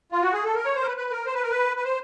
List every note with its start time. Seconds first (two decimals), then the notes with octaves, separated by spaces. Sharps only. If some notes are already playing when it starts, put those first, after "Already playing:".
0.12 F4
0.22 F#4
0.33 G#4
0.44 A4
0.55 A#4
0.65 C#5
0.75 C5
0.82 A#4
0.87 B4
0.97 B4
1.11 A#4
1.26 C5
1.34 B4
1.43 A#4
1.50 B4
1.77 B4
1.84 C5